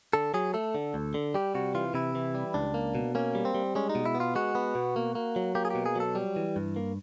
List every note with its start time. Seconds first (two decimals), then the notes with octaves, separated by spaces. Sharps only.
0.13 D3 A4
0.34 F#3 G#4
0.54 A3 A4
0.75 D3
0.94 D2
1.14 D3
1.34 G3 G4
1.55 C3 F#4
1.75 E3 F4
1.94 C3 E4
2.15 E3
2.35 G3
2.54 C#2 D4
2.74 A#3
2.95 B2
3.15 A#3 C#4
3.35 G3
3.45 C4
3.55 G3
3.75 G#3 C#4
3.90 D#4
3.95 B2
4.06 E4
4.15 B3
4.20 F4
4.35 G#3 F#4
4.55 B3
4.75 B2
4.96 A#3
5.15 A#3
5.36 F#3
5.55 A#3 G4
5.65 G#4
5.70 B2 G4
5.86 G#4
5.96 F#3 A4
6.15 G3
6.36 E3
6.56 G2
6.76 A#3